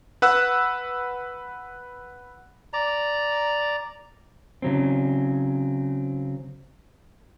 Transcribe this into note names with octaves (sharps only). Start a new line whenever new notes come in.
B4 F#5 E6 F#6
D5 A#5
C#3 F#3 C4